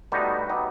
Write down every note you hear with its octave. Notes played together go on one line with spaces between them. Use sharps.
A2 G3 B3 D#4 F#4
F#3 B3 D#4 G4